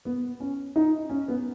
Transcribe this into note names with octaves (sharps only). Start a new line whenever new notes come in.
B3
C#4
D#4
C#4
B3